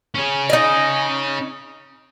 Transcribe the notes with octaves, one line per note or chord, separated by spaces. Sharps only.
C#4 G#4
D#4 D#5